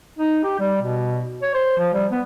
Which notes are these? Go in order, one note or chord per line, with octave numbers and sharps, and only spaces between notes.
D#4
G4
G3
B2
C#5
C5
F3
G3
B3